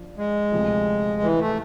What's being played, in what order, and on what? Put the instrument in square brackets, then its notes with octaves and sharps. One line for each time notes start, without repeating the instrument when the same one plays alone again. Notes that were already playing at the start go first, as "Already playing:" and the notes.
Already playing: [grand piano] F3 D4
[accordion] G#3
[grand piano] D2 C3 F3
[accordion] E3
A3